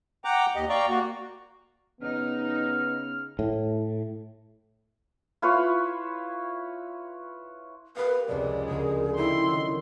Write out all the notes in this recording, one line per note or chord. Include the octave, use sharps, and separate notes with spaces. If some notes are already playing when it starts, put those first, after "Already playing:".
F#5 G5 A#5 D6
D#2 G4 D#5
D5 F5 G5 A#5 C#6
A#3 F#4
C#3 B3 D#4 F6
A2
E4 F4 B4 C#5
G4 A#4 B4 F5
F1 C#2 G#3 D5
D2 C#3 G#4 A#4
C#4 D#4 E4 G5 C6
D#3 F#3